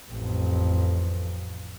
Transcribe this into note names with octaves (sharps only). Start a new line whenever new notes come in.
A1 F2